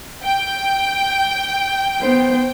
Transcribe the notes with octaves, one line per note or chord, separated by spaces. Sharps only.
G5
B3 C5